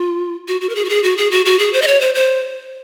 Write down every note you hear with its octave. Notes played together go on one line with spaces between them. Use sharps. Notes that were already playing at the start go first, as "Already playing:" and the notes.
Already playing: F4
F#4
F#4
A#4
G#4
F#4
G#4
F#4
G#4
F#4
F#4
G#4
C5
D#5
C#5
C5
C5